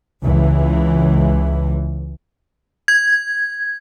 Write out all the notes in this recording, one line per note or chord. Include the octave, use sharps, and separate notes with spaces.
C#2 E3
G#6